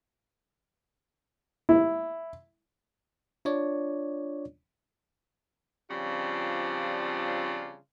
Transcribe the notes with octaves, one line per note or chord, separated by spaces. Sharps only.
E4
D4 F4 C#5 D5
C#3 F3 G3 C4 D4 F4